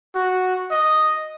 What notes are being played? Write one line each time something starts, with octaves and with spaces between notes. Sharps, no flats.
F#4
D#5